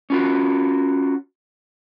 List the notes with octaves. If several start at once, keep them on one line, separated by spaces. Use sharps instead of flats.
C#4 F4 F#4